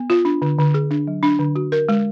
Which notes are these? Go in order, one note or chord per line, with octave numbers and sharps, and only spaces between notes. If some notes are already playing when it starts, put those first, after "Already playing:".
Already playing: B3
F4
D4
D3
D3
G#4
D4
F#3
D4
D3
F#4
A#4
G#3